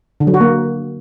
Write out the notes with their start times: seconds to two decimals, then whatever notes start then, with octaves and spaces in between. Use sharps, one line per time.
0.20 D3
0.27 F#3
0.34 F#4
0.41 A#3